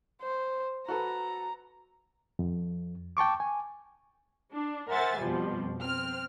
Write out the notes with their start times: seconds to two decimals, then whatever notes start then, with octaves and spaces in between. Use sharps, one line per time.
0.23 C5
0.88 F#4 A4 B4 A#5
2.39 F2
3.17 G5 A5 C#6 D6
3.40 G#5
4.54 D4
4.90 A#4 C5 E5 F#5 G#5 A6
5.19 F2 B2 F3 G3
5.80 C4 F6